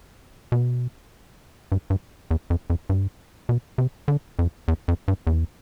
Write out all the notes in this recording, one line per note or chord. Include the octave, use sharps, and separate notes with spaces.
B2
G2
G2
E2
F2
F2
G2
B2
C3
D3
F2
E2
F2
G2
E2